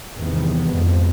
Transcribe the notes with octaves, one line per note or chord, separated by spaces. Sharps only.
E2 G2 C3 D#3 B3
F2 G#2